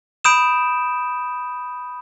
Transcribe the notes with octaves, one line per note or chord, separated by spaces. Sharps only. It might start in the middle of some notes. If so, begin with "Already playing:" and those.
B5 D#6 G6 D7 E7